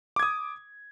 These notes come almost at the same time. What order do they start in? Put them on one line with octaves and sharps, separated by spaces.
D6 G#6 D#6